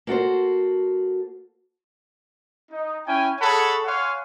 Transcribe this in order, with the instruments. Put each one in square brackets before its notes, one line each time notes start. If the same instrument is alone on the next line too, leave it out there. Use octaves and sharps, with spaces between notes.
[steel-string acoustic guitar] A#3 F#4 A4 C5
[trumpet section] D#4
C#4 E4 G5 G#5
G#4 A4 C#5 F#5 B5
C#5 F5 F#5 G#5 C6